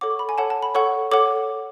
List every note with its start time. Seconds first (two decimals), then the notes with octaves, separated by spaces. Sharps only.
0.01 A4 C#5 F#5 D6
0.10 C#6
0.19 B5
0.29 G#5
0.38 A4 C#5 F#5 A5
0.50 A5
0.62 B5
0.75 A4 C#5 F#5 C#6
1.12 A4 C#5 F#5 D6